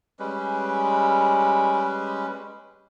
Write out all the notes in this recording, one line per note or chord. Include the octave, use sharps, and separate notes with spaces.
G3 G#3 C#4 B4